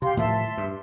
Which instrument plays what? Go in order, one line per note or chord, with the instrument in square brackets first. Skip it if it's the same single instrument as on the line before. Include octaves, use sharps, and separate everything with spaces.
[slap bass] C3 [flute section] G4 F5 C6
[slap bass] A2 D#3 F3 [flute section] E5 A5 C6
[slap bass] G2